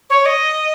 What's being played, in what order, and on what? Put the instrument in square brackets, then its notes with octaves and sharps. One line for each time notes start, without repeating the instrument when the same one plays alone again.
[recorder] C#5
D#5